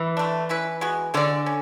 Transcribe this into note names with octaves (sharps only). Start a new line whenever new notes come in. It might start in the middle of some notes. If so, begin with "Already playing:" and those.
Already playing: E3
D3 A3 D4
C#4 E4 B4
G#3 B3 F#4
D3 G#3 C#4 G#4 D5
C#4